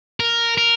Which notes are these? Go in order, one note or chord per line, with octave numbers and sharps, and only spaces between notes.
A#4
A#4